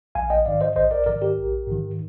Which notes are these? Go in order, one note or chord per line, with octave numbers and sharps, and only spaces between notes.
A#1 F5 G#5
D#5 G5
G#2 D#3 D5 F5
C5 D#5
A#1 C5 D#5
A#4 D5
G#2 D#3 A#4 D5
G4 A#4
A#1
G#2 D#3